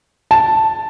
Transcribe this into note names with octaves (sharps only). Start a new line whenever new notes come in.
A5